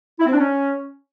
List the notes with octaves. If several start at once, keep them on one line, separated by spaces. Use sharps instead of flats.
E4
C4
D4
C#4